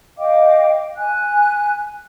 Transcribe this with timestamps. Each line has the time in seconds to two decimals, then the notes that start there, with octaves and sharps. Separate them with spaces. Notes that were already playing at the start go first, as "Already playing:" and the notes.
0.17 D#5 F5 G5 D6
0.95 G#5 F#6